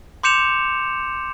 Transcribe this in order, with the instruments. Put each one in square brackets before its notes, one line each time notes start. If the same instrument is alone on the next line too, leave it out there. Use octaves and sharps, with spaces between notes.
[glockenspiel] C6 D6 G6 C#7 E7 F7